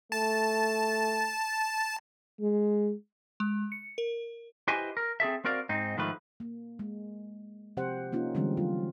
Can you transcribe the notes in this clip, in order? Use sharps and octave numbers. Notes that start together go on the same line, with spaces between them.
A3 A5
G#3
G#3
C#7
A#4
E4 G4 B4 C5 D#5 G#5
A#4
C4 G#4 A4 E5
C4 F#4 A#4 D5 F5
G#2 C4 D#4
G#2 D#3 F3 A3 B4
A#3
G#3
C3 F3 C4 G4 C5 F#5
A#3 C#4 D#4 F4
D3 E3 G3 G#3 C4 D4
F3 F#3 F4